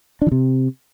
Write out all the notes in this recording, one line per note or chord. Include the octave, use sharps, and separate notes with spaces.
D4
E3
C3